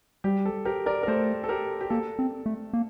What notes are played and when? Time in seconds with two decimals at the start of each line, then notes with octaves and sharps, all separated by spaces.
0.24 G3 G4
0.46 A4
0.65 G4 A#4
0.86 A#4 D5
1.03 A#4
1.07 A3 A4 C5
1.44 A4
1.49 G4 A#4
1.81 G4
1.90 A#3 A4
2.19 C4
2.46 A3
2.73 A#3